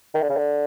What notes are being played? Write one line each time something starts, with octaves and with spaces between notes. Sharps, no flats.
D#3
D3
C#3
D3